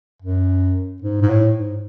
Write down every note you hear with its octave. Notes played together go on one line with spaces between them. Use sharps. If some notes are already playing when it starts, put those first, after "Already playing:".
F#2
G#2
G#2
A2
G#2